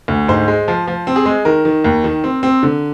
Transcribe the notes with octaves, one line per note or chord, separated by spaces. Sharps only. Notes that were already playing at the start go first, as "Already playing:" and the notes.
D2
G#2 C5
G#3
F3
F3
C4
G#4
G#3
D#3 A#4
D#3
D#2
D#3
C4
C4
D3